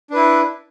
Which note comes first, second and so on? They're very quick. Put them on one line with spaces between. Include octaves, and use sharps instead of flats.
D4 B4 E4